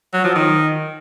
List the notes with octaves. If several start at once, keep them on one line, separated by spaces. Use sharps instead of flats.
F#3
F3
D#3